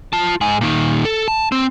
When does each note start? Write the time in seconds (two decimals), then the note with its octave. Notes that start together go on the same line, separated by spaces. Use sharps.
0.13 F4 A5
0.41 G#2 G#4
0.61 A#2 D#3
1.05 A4
1.28 A5
1.52 C4